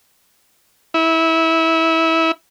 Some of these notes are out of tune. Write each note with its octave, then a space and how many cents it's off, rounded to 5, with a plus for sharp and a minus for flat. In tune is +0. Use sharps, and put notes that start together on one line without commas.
E4 -20